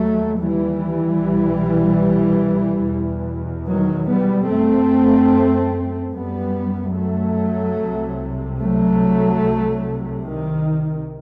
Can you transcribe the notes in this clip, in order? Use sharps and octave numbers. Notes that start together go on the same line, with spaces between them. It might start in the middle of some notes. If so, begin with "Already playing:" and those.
Already playing: D#2 F#3 A3
E3 G3
C2 B2
E2 B2
D#3 F#3
G3 B3
F#2 A3 C4
F#2 G3 B3
F#3 A3
C2 C3
F#3 A3
C2 C3
D#3